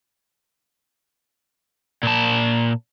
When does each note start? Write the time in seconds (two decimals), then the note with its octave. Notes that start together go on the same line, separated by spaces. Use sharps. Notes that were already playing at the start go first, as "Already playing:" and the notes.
2.03 A#2 A5